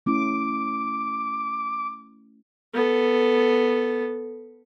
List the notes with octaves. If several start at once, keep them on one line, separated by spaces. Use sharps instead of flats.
A3 C#4 E4 D6
B3 A4